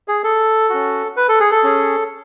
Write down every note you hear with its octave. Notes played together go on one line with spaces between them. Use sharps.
G#4
A4
C#4 F#4
B4
A4
G#4
A4
C#4 G#4